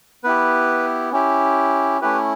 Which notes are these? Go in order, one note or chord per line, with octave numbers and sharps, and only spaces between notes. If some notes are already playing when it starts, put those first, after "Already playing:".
B3 E4 G4 B4
C#4 E4 G4
A3 C#4 E4 G4 B4